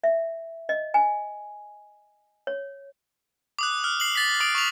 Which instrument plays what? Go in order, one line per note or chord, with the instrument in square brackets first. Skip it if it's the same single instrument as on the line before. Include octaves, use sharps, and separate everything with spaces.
[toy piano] E5
D#5
G#5
C#5
[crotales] D6 D#6 F#6
F6
C7 F#7
A6 B6
D6 D#6 D7
C#6 F7